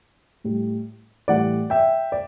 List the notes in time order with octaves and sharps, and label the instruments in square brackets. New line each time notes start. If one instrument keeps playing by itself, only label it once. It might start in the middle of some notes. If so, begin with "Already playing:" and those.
[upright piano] A2 G3
A2 E3 G3 D5 F#5
E5 G5
D5